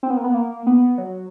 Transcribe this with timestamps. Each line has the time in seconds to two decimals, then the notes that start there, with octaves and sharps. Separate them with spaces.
0.03 C4
0.10 B3
0.17 A#3
0.24 B3
0.34 A#3
0.66 B3
0.98 F#3